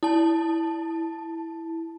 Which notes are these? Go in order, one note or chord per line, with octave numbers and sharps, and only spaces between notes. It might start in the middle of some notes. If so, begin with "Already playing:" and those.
E4 A5